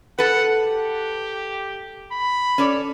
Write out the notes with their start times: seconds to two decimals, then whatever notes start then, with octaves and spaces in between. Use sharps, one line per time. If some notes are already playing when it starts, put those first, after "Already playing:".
0.18 A4 B4 F#5
0.61 G4
2.12 B5
2.58 C#4 A4 D5